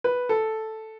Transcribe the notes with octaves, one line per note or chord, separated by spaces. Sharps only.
B4
A4